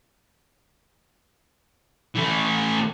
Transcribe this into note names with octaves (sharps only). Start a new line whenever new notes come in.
E3 A3